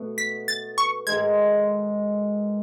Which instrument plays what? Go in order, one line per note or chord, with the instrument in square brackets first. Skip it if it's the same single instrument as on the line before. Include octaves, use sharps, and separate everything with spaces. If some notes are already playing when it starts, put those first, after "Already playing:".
Already playing: [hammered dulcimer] B2 A3
[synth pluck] B6
A6
C#6
[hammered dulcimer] G#2 D#3 G#3 [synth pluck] G#6